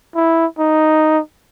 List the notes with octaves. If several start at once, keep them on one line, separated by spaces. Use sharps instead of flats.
E4
D#4